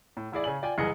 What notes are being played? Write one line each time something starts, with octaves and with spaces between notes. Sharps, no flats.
A2
A1 E4 G#4 D5
C#3 C#5 G#5 F#7
F4 D5 G5 G#5
F#1 C2 E3 G#4 D#5 C#7